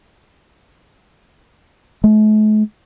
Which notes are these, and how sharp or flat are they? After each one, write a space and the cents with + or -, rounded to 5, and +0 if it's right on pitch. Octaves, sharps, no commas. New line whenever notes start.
A3 -45